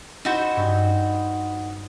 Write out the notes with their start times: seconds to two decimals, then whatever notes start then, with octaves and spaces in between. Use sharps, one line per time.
0.25 D#4 E4 F#4 C5
0.56 G2